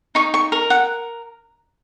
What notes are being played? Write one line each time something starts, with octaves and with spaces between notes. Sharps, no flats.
D#4 C#6
C#6
A#4
F#5